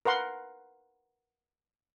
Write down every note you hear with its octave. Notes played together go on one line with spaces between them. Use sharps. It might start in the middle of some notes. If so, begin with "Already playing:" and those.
A#4 B4 F#5 C6